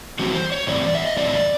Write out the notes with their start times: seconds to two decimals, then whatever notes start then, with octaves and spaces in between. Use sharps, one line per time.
0.19 A2 E3 G3 C4 F#4
0.35 C5
0.52 C#5
0.67 A2 E3 G3 C4 D5
0.95 E5
1.06 D#5
1.17 A2 E3 G3 C4 D5